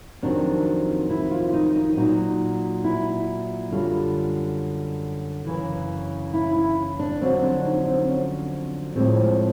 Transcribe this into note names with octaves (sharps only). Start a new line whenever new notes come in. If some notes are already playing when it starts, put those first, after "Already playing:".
F2 C3 D#3 F#3 D4
E4
F4
D#4
D#4
A#2 F#3 D#4
E4
F#2 D3 G3 F4
F#2 C#3 E3
E4
E4
D4
F2 D3 F#3 C4
D4
D#4
C4
C#4
A2 F3 G#3 C4